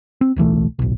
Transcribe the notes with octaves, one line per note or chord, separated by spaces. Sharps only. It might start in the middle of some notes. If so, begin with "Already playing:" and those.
C4
D1 B1 E3 A3
D1 B1